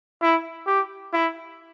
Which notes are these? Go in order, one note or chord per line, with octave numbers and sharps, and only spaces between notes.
E4
G4
E4